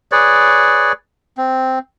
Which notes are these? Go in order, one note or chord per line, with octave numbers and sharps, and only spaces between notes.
G#4 B4 C#5 D5
C4